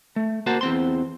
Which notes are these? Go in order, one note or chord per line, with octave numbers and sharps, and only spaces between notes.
A3
A#3 F#4 C5 A5
E2 C4 C6